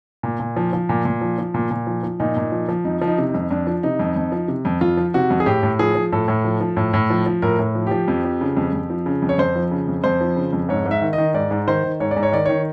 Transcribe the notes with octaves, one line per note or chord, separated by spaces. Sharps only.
A#2
A#2
F3
F3
A#2
A#2
F3
F3
A#2
A#2
F3
F3
A#2 D#4
A#2
F3
F3
F2 D#4
F3
D#4
C3
D#4
F2
F2 D4
F3
C3 D#4
F2
F2
F3
C3
F2
F2 F4
F3
C3 F#4
F2
G#4
A2 G4
A2
F3 G#4
F3
A2 A4
A2
F3
F3
A2
A2
F3
F3
A2 A#4
A2
F3
F3 G4
F2
F3
C#3
F2
F2
F3
C#3
F2
C#5
F2 C5
F3
C#3
F2
F2 C5
F3
C#3
F2
G#2 C#5
G#2
E5
D#3
D#5
D#3
G#2 D5
G#2
D#3 C5
D#3
G#2 C#5
D5
G#2
C#5
D#3 D5
D#3 C#5